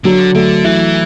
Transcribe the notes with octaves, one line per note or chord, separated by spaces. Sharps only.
D3 F#3
D3 A3
E3 E4